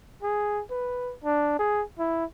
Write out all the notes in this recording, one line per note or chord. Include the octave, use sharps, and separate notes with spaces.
G#4
B4
D4
G#4
E4